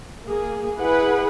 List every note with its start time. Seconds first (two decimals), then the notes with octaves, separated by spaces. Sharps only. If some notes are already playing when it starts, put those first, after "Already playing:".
0.24 A#3 G#4
0.79 E4 G#4 B4 F#5